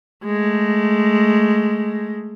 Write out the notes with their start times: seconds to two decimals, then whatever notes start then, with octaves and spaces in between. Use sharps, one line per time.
0.25 G#3 A3